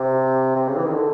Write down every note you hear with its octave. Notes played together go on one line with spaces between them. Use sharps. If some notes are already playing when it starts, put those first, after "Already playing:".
Already playing: C3
C3
C#3
E3
D#3
D3